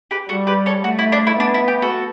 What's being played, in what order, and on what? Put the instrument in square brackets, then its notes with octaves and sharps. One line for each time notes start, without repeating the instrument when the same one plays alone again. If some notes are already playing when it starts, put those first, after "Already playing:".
[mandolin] G4 B4
[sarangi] G3 [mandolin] F#4 A4
[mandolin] G4 B4
A4 C#5
[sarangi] A3 [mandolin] F#4
[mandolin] E4
D4
E4
[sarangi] B3 [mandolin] D4
[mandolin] E4
G4
F#4 A4